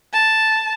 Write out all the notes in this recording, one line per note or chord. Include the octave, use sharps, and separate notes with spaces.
A5